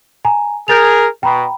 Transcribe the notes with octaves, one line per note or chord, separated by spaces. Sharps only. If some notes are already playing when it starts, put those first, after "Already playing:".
G#5 A#5
G#4 A#4 G6 A6 F7
B2 G5 A#5 B5